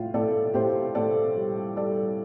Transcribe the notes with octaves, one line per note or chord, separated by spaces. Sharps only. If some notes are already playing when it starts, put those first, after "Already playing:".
Already playing: A2 F4
A2 A4 D5
A2 G4 C5
A2 A4 D5
G3
G3 A4 D5